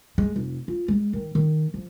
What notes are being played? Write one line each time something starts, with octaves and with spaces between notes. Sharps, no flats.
G#3
F1
F4
G#3
D#3
D#3
F3